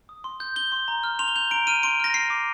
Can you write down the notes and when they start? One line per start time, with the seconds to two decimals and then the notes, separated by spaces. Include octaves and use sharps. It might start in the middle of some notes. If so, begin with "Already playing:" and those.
0.09 D#6
0.24 C6
0.40 G6
0.56 G6 G7
0.72 C6
0.88 A#5
1.03 F6
1.19 C6 F7
1.28 G7
1.36 G6 F7
1.51 A#5 D7
1.67 F6 D#7
1.83 C6 D7
2.00 F6 A#6
2.14 F6 C7
2.30 D6